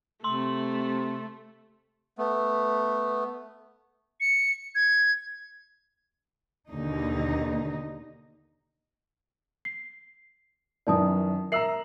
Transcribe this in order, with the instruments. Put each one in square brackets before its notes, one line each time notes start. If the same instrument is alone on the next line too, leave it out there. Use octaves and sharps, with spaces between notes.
[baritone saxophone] C3 [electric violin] A3 [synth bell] C6 F#7
[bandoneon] A3 B3
[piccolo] C#7
G#6
[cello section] D#2 B2 D3 D#4
[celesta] C7
[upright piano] F#2 D#3 E3 [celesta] D5 A5 D#6
[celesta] A#4 E5 F#7 [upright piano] A#5 E6 C7